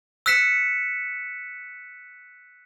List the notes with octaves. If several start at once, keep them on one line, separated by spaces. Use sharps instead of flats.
E6 F#6 B6 C#7 E7